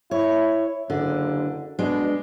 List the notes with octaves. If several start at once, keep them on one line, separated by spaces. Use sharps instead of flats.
E4 C#5
F#1 D3
B2 G#3 D4